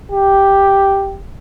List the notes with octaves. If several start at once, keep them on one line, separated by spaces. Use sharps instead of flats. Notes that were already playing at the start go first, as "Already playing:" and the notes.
G4